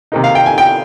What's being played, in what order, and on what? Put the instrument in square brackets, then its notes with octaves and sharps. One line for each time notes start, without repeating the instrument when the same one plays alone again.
[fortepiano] C3 D#3 A#3 D#4
F5
G5
G#5
G5